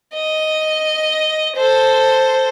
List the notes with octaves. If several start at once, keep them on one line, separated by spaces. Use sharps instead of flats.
D#5
A4 C5